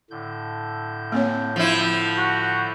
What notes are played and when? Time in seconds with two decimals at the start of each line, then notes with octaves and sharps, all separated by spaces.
0.11 A2 D3 G6
1.12 A#3 C4 C#5
1.56 F3 E4
2.18 F#4